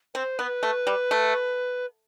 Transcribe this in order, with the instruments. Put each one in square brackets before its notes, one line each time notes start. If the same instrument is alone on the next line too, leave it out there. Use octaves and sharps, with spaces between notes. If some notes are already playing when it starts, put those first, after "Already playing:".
[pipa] C4 [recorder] C5
[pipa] B3 [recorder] B4
[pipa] A3
G3
A3